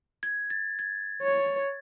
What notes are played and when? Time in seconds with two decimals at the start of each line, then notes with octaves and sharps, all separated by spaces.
0.23 G#6
0.50 A6
0.79 G#6
1.22 C#5